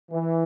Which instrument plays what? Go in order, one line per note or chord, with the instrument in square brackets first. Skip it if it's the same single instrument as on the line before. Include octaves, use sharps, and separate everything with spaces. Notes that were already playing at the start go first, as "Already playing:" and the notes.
[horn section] E3